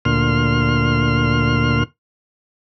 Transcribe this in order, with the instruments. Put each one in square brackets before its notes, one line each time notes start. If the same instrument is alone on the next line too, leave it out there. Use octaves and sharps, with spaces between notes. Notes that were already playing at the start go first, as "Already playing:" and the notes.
[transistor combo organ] D2 A#2 C6 F6